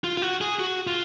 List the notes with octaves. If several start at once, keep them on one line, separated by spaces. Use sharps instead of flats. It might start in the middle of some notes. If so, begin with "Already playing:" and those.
F4
F4
F#4
G#4
F#4
F4